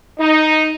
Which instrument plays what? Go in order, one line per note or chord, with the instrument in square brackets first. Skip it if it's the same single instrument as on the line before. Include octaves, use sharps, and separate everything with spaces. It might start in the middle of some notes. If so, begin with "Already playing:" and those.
[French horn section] D#4